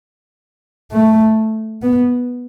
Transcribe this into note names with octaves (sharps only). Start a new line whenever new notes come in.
A3
B3